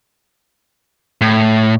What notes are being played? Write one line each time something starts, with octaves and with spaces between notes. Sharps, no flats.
A2